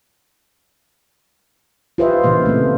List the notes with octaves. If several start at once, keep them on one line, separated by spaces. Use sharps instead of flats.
F4 G4 B4 C5 D#5 E5
A#2 C#3 E3 A#3 F5
A3 C4